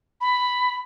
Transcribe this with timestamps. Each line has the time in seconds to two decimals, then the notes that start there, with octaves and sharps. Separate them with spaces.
0.21 B5